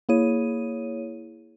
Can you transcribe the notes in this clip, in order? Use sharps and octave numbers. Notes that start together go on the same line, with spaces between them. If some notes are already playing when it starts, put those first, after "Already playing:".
A#3 E4 G#4 C#5 D#7